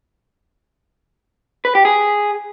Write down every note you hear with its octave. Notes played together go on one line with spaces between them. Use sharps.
B4
G4
G#4